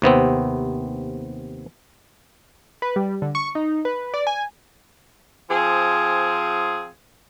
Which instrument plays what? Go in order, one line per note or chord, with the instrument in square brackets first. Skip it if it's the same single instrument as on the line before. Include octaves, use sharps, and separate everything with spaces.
[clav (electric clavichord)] D#2 C3 B3 C4
[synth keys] B4
G3
D3
C#6
D#4
B4
D5
G#5
[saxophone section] F3 C4 G#4